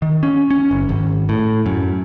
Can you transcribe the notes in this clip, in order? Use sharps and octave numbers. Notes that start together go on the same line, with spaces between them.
D#3
C#4
C#4
F#1
G#1
A2
F#2